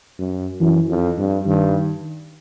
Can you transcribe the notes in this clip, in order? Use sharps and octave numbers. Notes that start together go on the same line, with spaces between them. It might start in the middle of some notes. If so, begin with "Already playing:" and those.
F#2
F#2 E3
F2
G2
G2 D#3